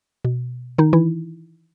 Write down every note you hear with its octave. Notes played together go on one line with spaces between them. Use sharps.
B2
D#3 D#4
E3 E4